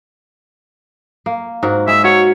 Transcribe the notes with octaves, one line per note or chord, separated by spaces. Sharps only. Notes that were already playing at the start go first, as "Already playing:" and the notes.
A#3
G#2 F#4 A#4
G#3 E5
F#4 A#4 C#5